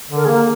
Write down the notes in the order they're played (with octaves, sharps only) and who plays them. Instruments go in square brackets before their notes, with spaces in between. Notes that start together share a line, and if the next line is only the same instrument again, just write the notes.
[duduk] D3
[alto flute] A#4
G#4
[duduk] A#3 [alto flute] A#4